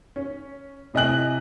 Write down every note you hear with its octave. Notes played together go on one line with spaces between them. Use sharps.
C#4
A2 C3 D#5 G#5 F#6 F#7